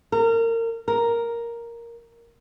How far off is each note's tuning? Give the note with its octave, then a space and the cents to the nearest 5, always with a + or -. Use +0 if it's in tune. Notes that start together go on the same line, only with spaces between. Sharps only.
A#4 -30
A#4 +0